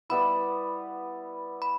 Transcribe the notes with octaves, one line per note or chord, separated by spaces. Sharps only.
G3 B3 E4 B5
B5